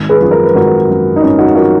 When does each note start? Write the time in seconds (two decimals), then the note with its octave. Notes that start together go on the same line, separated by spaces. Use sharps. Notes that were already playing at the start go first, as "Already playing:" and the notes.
Already playing: G#1
0.09 G#4 B4
0.20 F#2 F3
0.31 A#4
0.44 B4
0.54 G#1 F#4 A#4
0.88 F#2 F3
1.16 D#4
1.21 G#1 C#4
1.38 D#4 F#4
1.55 F3 F#4 A#4